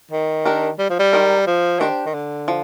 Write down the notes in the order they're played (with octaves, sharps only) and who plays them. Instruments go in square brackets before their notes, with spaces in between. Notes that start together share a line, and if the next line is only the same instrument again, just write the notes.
[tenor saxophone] D#3
[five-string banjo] D4 G4 A#4
[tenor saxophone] G3
F3
G3
[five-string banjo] D#3 G#3 D#4 A#4
[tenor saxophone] F3
[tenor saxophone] D#3 [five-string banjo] D4 G4 C5
[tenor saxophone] D#3
D3
[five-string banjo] F3